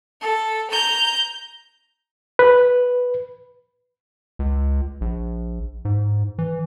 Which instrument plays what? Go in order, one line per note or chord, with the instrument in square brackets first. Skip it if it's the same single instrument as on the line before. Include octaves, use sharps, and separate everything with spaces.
[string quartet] A4
A#5 G6
[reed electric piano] B4
[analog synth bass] C#2
A#1
G#2
E3